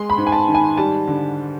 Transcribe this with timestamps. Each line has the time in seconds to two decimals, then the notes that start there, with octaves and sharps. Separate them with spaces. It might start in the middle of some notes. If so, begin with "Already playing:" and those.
Already playing: G#3 C6
0.10 B5
0.17 G#2
0.27 G#5
0.32 A5
0.48 D#3
0.55 G#5
0.77 G3 A5
1.07 D3